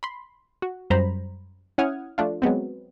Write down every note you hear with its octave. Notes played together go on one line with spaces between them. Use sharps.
B5 C6
F#4
F#2 G3 C5 A#5 B5
C#4 E4 F#5 D#6 F6 G#6
F3 A3 D4 F4
F#3 G#3 B3 C4